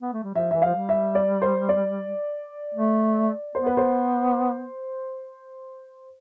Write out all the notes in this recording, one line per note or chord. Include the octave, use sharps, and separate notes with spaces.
B3
A3
G3
F3 E5
E3 E5
F3 F5
G3
E5
D5
C5
D5
A3
B3 C5
B4
C5